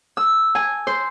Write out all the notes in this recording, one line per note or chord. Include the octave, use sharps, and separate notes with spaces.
E6
G#5
C5